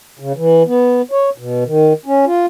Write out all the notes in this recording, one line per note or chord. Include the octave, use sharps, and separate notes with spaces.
C#3
E3
B3
C#5
B2
D#3
C#4
F4